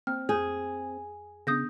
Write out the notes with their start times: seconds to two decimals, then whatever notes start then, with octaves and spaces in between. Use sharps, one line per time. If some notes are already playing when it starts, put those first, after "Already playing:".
0.07 A#3 C4 F6
0.29 F2 G#4 G6 G#6
1.47 C#3 B3 D4 D#6 G6 A#6